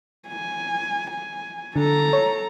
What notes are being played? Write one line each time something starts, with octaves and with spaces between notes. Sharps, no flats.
G#5
G#5
D3 A4 A#5
C#5